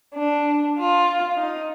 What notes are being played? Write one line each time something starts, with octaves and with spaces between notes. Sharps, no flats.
D4
F4
D#4